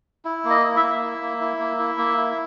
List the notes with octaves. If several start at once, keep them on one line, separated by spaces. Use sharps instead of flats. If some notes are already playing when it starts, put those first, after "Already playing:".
E4
A#3
D#5
E4
E5
A#3
E4
A#3
E4
A#3
E4
A#3
E4